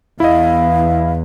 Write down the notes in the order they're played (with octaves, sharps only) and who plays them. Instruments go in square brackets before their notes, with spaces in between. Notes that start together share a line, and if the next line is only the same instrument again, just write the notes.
[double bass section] E2 [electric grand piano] E4 D#5 [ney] F5